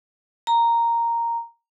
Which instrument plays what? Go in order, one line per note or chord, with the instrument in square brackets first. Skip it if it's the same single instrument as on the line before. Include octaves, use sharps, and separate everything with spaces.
[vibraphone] A#5